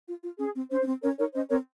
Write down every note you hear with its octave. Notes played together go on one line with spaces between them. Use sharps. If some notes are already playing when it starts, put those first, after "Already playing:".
F4
F4
C#4 G#4
C4
C#4 C5
C#4
C4
C#4 A#4 C#5
D#4 A#4 C#5
C#4 C5 D#5
C4 A#4 C#5